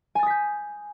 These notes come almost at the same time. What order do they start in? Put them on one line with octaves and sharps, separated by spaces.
G#5 A6 D#6 B6 G6